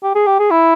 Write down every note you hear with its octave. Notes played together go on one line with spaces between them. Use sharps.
G4
G#4
G4
G#4
E4